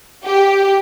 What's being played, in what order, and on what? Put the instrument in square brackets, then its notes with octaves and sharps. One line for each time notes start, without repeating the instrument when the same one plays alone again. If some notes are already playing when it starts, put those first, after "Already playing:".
[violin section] G4